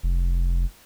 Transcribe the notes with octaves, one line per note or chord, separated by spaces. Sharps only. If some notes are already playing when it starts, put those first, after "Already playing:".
F1